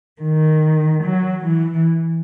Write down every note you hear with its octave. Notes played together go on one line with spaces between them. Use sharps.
D#3
F#3
E3